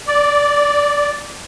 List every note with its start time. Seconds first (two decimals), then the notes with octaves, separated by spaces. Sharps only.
0.07 D5